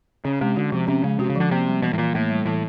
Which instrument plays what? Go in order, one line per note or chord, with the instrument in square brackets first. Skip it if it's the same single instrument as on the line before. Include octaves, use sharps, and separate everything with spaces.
[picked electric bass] C#3 [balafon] C#4
[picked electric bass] C3 [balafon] G#3
[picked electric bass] D3 [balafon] F#4
[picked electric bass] C3 [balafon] F3
[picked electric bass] C3 [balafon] C#4
[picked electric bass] C#3 [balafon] G#3
[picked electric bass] C3 [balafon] F#4
[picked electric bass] C#3
[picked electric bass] D3 [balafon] F3
[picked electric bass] C3 [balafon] A#3
[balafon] G3
[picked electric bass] B2 [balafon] E3
[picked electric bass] A2
[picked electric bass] A#2 [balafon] E3
[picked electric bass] A2 [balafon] A#3
[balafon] G3
[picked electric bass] A2 [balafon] E3